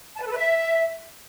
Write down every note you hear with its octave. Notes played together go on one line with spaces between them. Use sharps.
A5
B4
A4
B4
E5